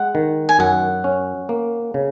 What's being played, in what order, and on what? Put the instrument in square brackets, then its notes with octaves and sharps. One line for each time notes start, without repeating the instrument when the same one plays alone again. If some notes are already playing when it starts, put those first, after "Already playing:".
Already playing: [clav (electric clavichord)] G#3 [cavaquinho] F#5
[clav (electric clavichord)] D#3
[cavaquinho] G#5
[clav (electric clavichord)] F#2 [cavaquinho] F#5
[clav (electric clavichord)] C#4
A#3
C#3